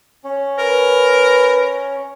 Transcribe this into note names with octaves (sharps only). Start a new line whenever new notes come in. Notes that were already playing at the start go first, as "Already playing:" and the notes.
C#4
A#4 B4